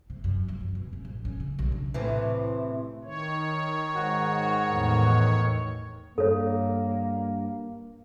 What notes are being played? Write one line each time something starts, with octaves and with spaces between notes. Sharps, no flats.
C3
F#2
E2
F#2
B2
C#4
A1
C#4
C#3
B1
D4
A2 C3 E3
D#3 C#5
G#2 F#4
E2 A2
G2 A#3 A4 C#5